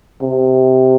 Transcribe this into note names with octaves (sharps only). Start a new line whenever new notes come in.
C3